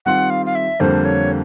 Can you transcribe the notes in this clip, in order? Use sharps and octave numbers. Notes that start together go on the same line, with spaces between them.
D#3 G3 C4 F4 F#5
F5
F5
E5
F2 D3 G3 A#3 C5
C#5